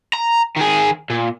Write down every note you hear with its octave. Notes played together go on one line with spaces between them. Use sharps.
A#5
D#3 G#4
A#2